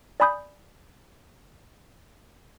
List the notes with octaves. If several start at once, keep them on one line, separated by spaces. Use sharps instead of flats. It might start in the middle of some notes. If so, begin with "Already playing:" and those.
D5 G#5 B5 D#6 G6